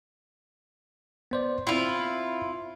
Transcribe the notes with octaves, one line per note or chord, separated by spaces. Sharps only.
B3 C5 D5
C4 E4 F4 C6